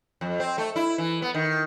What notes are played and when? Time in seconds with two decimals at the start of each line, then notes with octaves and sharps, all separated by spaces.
0.21 F2
0.40 C4
0.58 A3
0.76 E4
0.98 E3
1.22 B3
1.35 D#3